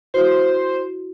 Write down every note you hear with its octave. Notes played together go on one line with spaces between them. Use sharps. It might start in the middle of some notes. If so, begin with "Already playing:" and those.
E4 F#4 C5